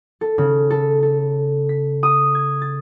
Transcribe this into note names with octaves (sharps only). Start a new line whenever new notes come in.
A4
C#3
A4
A4
B6
D#6
G#6
A6